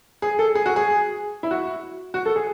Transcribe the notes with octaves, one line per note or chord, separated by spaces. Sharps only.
G#4
A4
G#4
F#4
G#4
E4
F#4
F#4
A4
G#4